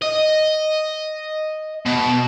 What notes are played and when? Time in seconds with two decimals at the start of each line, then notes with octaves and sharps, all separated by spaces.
0.02 D#5
1.86 B2